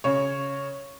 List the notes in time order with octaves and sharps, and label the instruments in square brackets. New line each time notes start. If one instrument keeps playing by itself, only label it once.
[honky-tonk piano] C#3 C#5